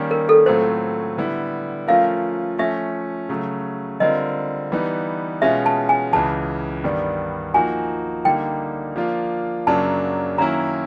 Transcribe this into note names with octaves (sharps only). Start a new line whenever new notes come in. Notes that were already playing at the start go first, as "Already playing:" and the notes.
Already playing: D#3 G3 A#3 C#4
A#4
A4
A2 F#3 A3 C4 F4 C5
D3 G3 B3 E4
F3 A3 C#4 F4 A#4 F5
F3 A3 C#4 E5
C#3 F#3 A3
D3 G3 C4 F4 A#4 D#5
E3 G3 B3 D#4
B2 G#3 C#4 F4 E5
A5
G#5
C#2 C#3 E3 A5
G2 D#3 G3 B3 D4
F3 A#3 D#4 F#4 G#5
D3 G3 A#3 D#4 G5
F3 A#3 D4 F4
F#2 C#3 F#3 A#3 D4 A5
D#3 F#3 A#3 C#4 E4 A#5